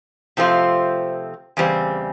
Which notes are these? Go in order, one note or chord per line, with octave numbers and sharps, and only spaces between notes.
C3 F3 A3 C4 F4
E2 C#3 G3 C4